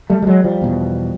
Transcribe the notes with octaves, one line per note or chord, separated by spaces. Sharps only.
G3 A3
G3
F#3 G#3
F3 G3
E2 B2